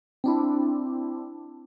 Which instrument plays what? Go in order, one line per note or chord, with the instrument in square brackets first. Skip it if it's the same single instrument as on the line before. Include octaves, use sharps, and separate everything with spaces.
[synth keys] C4 D4 E4